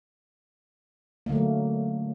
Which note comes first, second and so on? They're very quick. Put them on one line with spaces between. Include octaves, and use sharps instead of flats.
A#3 D3 A3 F#3